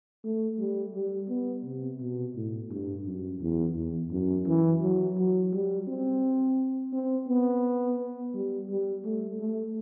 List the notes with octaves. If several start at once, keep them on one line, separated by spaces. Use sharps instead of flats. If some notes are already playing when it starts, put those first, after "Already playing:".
A3
G3
G3
B3
C3
B2
A2
G2
F#2
E2
E2
F#2
E3
F#3
F#3
G3
C4
C4
B3
G3
G3
A3
A3